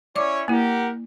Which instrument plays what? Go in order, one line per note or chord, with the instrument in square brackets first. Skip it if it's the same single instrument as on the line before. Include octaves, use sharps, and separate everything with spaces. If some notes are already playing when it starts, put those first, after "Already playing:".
[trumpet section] C#4 E4 C#5 [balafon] D5 D6
[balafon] A#3 E4 [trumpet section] G4 A#4 F#5